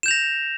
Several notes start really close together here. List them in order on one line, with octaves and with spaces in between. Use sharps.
E7 G6 F7 A#6